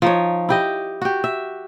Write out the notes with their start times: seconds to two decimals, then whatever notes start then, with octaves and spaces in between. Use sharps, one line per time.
0.02 F3 D#4 C#5
0.49 E4 G4 D#5
1.02 F#4 G4
1.24 E5